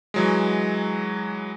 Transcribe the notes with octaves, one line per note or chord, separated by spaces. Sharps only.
E3 F#3 G#3